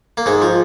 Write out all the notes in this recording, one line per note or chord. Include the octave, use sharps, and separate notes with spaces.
A#3
G#2 G#3
F3